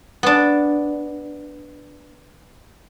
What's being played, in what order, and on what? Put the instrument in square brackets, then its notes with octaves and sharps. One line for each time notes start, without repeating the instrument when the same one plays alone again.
[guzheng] B3 D4